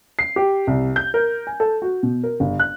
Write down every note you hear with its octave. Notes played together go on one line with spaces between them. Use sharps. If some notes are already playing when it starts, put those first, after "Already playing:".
C7
G4
C2
G6
A#4
G#5
A4
F#4
B2
A#4
G1
F#6